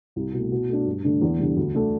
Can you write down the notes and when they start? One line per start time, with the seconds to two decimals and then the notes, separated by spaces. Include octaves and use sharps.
0.16 C2
0.33 B2 A3
0.52 B2
0.69 A3 D4
0.86 G2
1.04 D3 A3 D4
1.22 E2
1.39 D3 G3
1.57 D2
1.75 D3 A3 D4